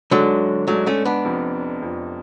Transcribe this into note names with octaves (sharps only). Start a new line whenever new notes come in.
G#2 D3 F#3 G#3 D4
G#2 F#3 G#3 A3 D4
A3 C#4
B3 D4
F1 F2 F3
F1 F2 F3